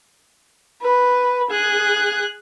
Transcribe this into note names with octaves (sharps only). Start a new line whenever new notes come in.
B4
G#4 F#6